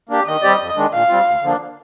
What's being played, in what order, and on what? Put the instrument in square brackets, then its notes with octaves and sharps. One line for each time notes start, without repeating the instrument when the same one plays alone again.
[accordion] A#3 D4 G4
[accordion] D#3 [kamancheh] D#5
[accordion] G3 C4 G4 D5
F2
D#3 G#3 D4
[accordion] A#2 [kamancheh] F5
[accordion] G3 C4 F4
D2
D3 F3 A#3 D4